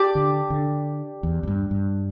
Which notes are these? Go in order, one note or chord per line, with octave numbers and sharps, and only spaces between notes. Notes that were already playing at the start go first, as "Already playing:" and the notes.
Already playing: G4 D5 A5
D3
D3
E2
E2
G2
G2